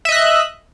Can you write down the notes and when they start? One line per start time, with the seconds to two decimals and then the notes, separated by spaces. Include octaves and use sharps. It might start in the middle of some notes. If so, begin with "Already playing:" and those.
0.05 E5
0.09 D#5
0.12 F#6